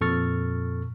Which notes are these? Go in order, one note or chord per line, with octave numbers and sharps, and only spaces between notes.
F2 A#2 A4 C#6 F6 A6